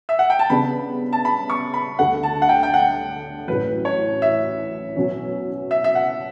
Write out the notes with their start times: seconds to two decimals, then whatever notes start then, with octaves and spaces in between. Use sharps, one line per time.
0.09 E5
0.19 F#5
0.30 G5
0.39 A5
0.50 C#3 G3 B3 D4 B5
1.13 A5
1.25 B5
1.50 C#6
1.74 B5
1.99 D2 D3 G3 D4 A4 F#5
2.23 A5
2.42 F#5
2.49 G5
2.63 G5
2.74 F#5
3.48 A1 A2 F#3 B4
3.85 C#5
4.22 E5
4.96 B2 F#3 C#4
5.71 E5
5.84 E5
5.95 F#5